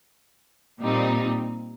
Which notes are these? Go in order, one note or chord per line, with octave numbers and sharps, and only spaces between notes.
A#2 G3 C4 D#4